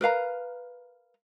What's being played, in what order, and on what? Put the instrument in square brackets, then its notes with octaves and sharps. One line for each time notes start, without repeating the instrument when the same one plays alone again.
[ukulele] A#4 B4 F5 A#5